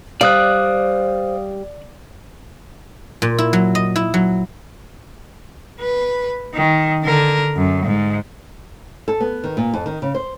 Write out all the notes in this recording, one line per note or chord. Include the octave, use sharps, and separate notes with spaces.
G3 C5 D5 F5 D#6 F#6
A#2
E4
F#3
D#5
E4
F#3
B4
D#3
D3 A#4
F#2
G#2
A4
B3
D#3
A#2
F2
D#3
C#3
C5